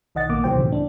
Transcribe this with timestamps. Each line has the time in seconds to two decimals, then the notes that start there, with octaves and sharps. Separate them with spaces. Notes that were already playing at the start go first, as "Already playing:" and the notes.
0.15 B1 D#3 D#5 F#5 A6
0.29 A#1 A#3 D6
0.44 D2 B2 D#3 F#3 C5 G5
0.56 C#2 A2 C3 E3 A3
0.72 D4